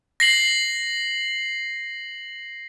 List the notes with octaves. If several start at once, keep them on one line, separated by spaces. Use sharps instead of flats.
A#6 C7 F#7